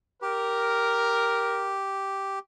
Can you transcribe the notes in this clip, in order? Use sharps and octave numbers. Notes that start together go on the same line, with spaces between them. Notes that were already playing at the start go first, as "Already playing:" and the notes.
G4 A#4